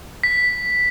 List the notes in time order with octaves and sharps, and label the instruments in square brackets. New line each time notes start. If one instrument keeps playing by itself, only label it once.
[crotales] B6